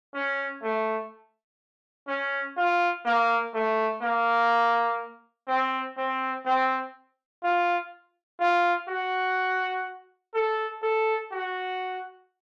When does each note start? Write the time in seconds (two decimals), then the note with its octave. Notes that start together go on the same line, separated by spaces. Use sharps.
0.14 C#4
0.63 A3
2.08 C#4
2.57 F4
3.05 A#3
3.54 A3
4.02 A#3
5.48 C4
5.97 C4
6.46 C4
7.43 F4
8.40 F4
8.89 F#4
10.35 A4
10.83 A4
11.32 F#4